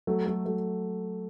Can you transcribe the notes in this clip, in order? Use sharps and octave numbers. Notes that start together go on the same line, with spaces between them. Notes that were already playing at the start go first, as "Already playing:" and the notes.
F#3 A3
F#3 A3
F#3 A3